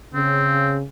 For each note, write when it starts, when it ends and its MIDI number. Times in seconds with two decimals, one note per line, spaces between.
0.15 0.84 49
0.15 0.77 60